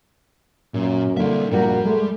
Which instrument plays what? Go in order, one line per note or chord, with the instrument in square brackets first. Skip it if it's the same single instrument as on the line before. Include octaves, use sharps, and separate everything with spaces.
[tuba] F#2 [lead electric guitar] A#2
[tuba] D3 [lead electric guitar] G3 E5 [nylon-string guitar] A#3 E4
[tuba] A#1 [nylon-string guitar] A#2 F#4 A#4 [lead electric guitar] G3
[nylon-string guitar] G#3 [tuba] A3